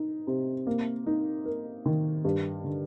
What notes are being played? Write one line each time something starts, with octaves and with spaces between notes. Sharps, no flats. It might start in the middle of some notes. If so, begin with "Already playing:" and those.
Already playing: D#4
C3
A#3
D#4
A#4
D#3
G2
D3